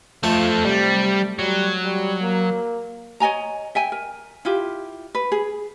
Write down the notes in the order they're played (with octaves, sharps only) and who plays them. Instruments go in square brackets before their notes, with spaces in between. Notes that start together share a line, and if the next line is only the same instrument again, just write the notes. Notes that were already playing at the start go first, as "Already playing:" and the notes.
[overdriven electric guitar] F3 A4 [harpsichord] A3 [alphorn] F4
[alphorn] C3 [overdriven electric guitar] G3
[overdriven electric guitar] F#3 [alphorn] G3
[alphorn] G3
A#3
[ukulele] C#5 D#5 G#5 A#5
E5 G5 G#5
A#4
E4 F4 G4
B4
G#4